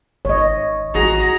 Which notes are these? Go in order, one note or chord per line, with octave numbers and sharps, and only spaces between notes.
G#1 C#5 D#5
A1 F#4 G#4 A#5